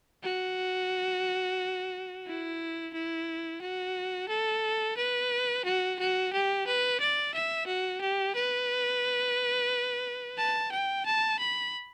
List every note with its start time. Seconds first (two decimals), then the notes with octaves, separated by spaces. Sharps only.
0.23 F#4
2.27 E4
2.93 E4
3.61 F#4
4.29 A4
4.97 B4
5.65 F#4
5.99 F#4
6.33 G4
6.67 B4
7.00 D5
7.34 E5
7.67 F#4
8.01 G4
8.35 B4
10.38 A5
10.72 G5
11.06 A5
11.39 B5